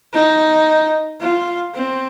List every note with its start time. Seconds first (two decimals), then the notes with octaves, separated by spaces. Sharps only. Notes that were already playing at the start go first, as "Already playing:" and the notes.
0.13 D#4
1.21 F4
1.74 C4